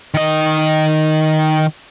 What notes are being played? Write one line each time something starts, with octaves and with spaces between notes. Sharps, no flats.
D#3 D#5